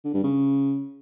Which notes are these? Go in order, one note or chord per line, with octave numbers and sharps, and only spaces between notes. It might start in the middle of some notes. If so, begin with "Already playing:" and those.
D3
G2
C#3